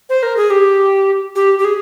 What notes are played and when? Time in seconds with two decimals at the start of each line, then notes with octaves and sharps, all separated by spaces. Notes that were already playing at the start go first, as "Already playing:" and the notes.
0.09 C5
0.23 A#4
0.37 G#4
0.50 G4
1.36 G4
1.59 G4
1.65 G#4